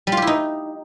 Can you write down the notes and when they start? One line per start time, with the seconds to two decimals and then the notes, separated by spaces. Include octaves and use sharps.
0.07 G3
0.12 F4
0.17 G4
0.22 E4
0.27 D#4